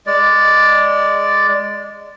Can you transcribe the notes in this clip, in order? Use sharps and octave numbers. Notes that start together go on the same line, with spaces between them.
G#3 D5